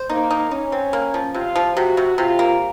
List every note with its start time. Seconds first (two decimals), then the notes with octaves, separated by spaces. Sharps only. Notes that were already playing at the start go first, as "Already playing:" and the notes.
Already playing: C5
0.10 A#3 D#4
0.30 D#4
0.51 C#4 D#4
0.72 C4
0.93 A#3
1.14 F3
1.34 C3 F4
1.56 F3
1.76 C3 F#4
1.97 C3
2.18 C3 F4
2.39 A#3